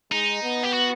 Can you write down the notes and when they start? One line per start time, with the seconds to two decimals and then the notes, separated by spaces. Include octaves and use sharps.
0.12 G#3 D#4
0.43 B3
0.63 G4
0.73 F#4